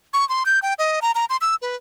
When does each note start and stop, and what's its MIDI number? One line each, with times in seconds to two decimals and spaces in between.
0.13 0.27 85
0.29 0.44 84
0.46 0.59 91
0.62 0.74 79
0.79 1.00 75
1.02 1.11 82
1.15 1.25 82
1.30 1.37 84
1.41 1.56 88
1.62 1.76 71